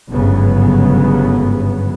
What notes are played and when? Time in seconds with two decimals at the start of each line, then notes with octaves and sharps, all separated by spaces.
0.11 G1 G#2 C#3 F#3 B3